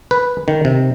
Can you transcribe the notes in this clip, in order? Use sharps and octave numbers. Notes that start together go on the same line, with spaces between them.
B4
D#3
C3